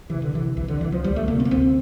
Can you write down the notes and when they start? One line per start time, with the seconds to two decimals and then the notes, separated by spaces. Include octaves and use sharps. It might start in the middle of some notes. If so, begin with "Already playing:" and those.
0.09 C3 E3
0.22 D3
0.33 C3 E3
0.56 C2 E3
0.68 D3
0.80 C2 E3
0.92 F3
1.04 D2 G3
1.16 A3
1.28 C3 A#3
1.40 C4
1.45 A#3
1.51 D2 C4